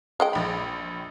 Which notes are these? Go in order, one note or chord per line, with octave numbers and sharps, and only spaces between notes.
G#3 D#5 G5
A#1 B5